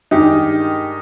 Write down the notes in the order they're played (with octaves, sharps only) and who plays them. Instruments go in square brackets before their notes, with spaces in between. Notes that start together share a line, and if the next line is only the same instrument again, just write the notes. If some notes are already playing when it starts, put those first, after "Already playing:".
[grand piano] G2 D#3 G#3 D#4 G4